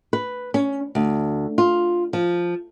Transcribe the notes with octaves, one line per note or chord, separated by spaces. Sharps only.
B4
C#4
D2
F4
F3